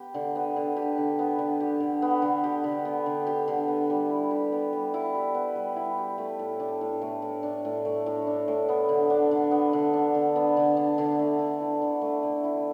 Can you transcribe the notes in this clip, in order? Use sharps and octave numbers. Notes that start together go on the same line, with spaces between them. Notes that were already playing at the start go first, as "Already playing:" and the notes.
Already playing: B3 G4
D3
B3
D3
G4
D3
B3
D3
G4
D3
B3
D3
G4
D3
B3
D3
G4
D3
B3
G3
E4
G4
B3
G3
E4
G4
B3
G3
E4
G4
A3
A2
D4
A2
A3
A2
D4
A2
A3
A2
D4
A2
B3
D3
D4
D3
B3
D3
D4
D3
B3
D3
D4
D3
A3
D3
E4
D3
A3
D3
E4